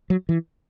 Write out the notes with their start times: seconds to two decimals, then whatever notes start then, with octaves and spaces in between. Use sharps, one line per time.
0.10 F#3
0.29 E3